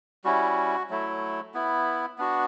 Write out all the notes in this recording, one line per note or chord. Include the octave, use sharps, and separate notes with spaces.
G3 C#4 E4 F#4
F#3 A3 E4
B3 E4
B3 D4 F#4